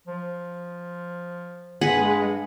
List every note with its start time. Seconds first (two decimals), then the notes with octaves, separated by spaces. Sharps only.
0.07 F3
1.81 G2 G#3 G#4 B4 F#5